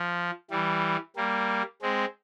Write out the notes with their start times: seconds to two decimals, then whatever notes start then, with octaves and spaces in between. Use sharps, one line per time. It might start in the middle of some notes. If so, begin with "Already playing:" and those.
Already playing: F3
0.51 E3 G3
1.16 G3 A#3
1.82 G#3 C4